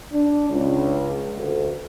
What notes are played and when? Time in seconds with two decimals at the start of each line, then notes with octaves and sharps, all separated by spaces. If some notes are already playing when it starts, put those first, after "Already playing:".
0.12 D4
0.50 C#2
1.37 D2